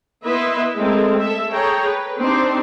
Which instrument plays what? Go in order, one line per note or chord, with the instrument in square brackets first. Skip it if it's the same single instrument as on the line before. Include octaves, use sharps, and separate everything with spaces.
[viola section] B3 E4 B4 D#5 E5 C6
G#3 A3 C4 A4 A#4
A4 E5
G#4 A4 C#5 G5 A#5
B4
C4 D4 D#4 G4 C5